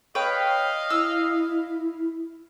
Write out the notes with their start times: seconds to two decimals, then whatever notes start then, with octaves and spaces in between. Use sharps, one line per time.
0.15 B4 C#5 D#5 F5 G5
0.90 E4 E6